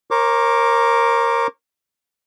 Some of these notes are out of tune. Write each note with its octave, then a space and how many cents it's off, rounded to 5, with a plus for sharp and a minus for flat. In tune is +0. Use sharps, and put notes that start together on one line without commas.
A#4 +0 C#5 -45 D6 -10